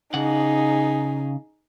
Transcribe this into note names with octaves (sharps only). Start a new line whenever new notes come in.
C#3 D#4 G#4 F#5